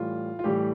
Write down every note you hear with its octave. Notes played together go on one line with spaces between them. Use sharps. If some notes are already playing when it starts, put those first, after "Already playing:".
Already playing: A2 E3 G3 F4
F4
A2 E3 G3 G4